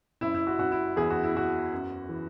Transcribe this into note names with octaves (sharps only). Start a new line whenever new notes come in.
F#1 E4
E4
F#4
F#1 F#4
E4
E2 G#4
F#4
E4
F#1 F#4
F#2
E3